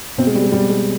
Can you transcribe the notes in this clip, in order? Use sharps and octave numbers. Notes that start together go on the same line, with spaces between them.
B2 C4
G#3
G3
G#3
B2 G3
G#3